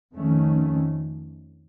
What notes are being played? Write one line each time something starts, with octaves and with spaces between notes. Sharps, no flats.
F2 D#3 A3 C#4